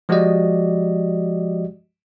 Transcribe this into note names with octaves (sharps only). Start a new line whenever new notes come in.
F3 G#3 F#4 G4 D5 D#5